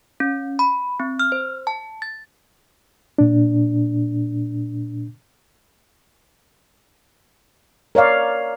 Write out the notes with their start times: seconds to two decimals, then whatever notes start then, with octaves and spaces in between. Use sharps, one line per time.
0.20 C#4
0.59 B5
1.00 C4
1.19 F6
1.32 C5
1.67 A5
2.02 A6
3.18 A#2 D4
7.95 A#4 C#5 D5 F5